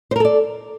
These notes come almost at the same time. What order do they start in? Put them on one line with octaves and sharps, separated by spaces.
C5 A#4 A4 D5